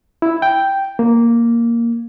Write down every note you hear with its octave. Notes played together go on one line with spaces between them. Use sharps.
E4
G5
A#3